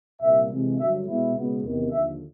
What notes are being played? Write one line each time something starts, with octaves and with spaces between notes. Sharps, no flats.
C2 A#2 G3 A#3 E5
C3 E3 G#3
G2 D3 F#3 E5
B2 G#3 B3 E4
C#2 B2 G#3 B3
E2 C3 D#3
D#2 D3 F3 E5